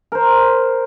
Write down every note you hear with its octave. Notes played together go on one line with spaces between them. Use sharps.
A#4 C5